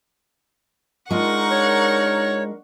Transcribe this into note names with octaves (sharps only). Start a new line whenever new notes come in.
G#3 D4 D#4 F4 A#4 F#5 C#6
C#5